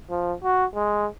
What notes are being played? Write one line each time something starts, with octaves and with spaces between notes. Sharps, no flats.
F3
F#4
G#3